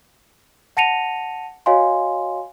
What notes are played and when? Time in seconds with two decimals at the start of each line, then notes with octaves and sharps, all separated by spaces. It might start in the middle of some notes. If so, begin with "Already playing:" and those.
0.77 F#5 A5 A#6 C#7 D#7 F7
1.66 F#4 C#5 D#5 F5 G#5 C6